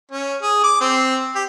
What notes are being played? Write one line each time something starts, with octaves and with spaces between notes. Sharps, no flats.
C#4
G#4
D6
C4
G4